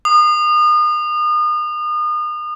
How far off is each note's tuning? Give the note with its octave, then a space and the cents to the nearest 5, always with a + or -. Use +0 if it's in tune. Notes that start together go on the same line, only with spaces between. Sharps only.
D#6 -35